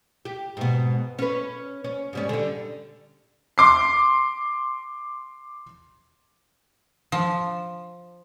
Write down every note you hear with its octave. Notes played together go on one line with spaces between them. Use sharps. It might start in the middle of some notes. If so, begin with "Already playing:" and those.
G4
G#2 B2
C#4 B4
C#4
G#2 G3 C#4
D3 G3
C6 D6 C7
F3